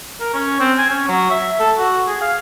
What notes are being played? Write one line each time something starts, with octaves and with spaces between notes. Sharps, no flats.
A#4
C#4
C4
G#5
C#4
F#3
E5
A4
F#4
G#4
F5